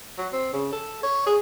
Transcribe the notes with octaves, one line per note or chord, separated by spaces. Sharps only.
F#3
C4
C#3
A4
C#5
G#4